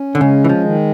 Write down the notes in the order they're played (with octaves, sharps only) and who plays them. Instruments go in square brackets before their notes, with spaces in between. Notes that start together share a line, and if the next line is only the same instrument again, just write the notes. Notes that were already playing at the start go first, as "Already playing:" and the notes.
Already playing: [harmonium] C#4
[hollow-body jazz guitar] D3
[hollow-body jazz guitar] C#3 [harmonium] G#3
[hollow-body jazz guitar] E3
F3
[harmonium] D#3